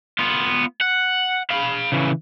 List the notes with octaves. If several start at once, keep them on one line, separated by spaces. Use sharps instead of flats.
B3 F4
F#5
F5 B5
C#3 E3